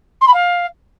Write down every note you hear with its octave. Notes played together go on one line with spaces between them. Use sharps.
C6
B5
F5